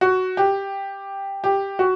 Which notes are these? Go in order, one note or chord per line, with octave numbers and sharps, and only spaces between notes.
F#4
G4
G4
F#4